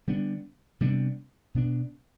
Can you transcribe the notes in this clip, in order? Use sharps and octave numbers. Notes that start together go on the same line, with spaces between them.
D3 G3 B3 D4
C3 G3 B3 D4
B2 B3 D4